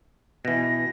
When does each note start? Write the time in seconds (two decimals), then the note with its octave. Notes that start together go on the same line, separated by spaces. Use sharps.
0.45 B2 E3 A#6